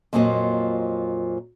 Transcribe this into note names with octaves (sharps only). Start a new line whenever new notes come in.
F2 A#2 F3 F#3 A#3 D#5